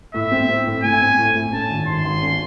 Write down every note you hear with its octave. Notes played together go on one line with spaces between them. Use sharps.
A2 E5
C4
C4
A2
A2 G#5
C4
A2
A2
C#4 A5
G#1
G#1 C6
G#1
C#4